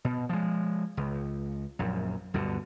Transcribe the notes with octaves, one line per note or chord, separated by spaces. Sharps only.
B2
F3 G#3
C#2
A#1 F#2
D2 G2 B2 D3